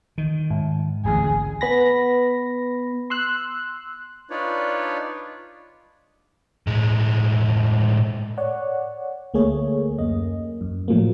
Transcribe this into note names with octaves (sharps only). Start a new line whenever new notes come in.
D#3
G#2
D1 A1 G#4
B3 B5 A#6
C6 E6 F#6
D4 D#4 F4 B4 C#5 D5
A2 G#3
C#5 D5 F#5
D2 A3 A#3 G#4 C#5
F#2 A#3 D#5
F#2
A2 F3 F#3 A3 A#3